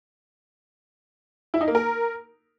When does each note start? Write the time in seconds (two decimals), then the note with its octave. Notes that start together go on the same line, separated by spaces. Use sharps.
1.54 E4
1.61 D#4
1.68 A#3
1.75 A#4